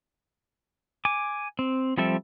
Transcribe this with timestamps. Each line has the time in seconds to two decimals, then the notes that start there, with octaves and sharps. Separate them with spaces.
1.05 G#5 D6
1.59 C4
1.98 F3 G3 C4 A4 E5